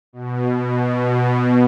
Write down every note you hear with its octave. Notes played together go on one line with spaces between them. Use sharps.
B2
B2